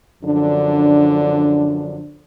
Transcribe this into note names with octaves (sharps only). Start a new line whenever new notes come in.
F#2 D3 F3 D4